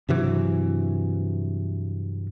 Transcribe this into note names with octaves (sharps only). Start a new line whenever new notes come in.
G2 C3 E3 F#3